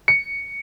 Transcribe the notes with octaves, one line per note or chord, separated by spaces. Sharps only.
C#7